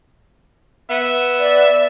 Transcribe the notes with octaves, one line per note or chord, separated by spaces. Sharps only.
B3 E5
D5